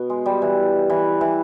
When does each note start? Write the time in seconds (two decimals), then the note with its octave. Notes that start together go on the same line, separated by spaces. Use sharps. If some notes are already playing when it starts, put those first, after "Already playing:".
Already playing: B2
0.10 G#3
0.26 G3
0.42 E3
0.90 E3
1.21 E3